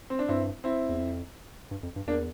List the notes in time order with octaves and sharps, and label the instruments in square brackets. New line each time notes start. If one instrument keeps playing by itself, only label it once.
[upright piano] C4
D4
[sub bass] G2 [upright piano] C4 E4
[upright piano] C4 E4
[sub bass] E2
F2
G2
F2
G2
[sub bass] E2 [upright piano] A#3 D4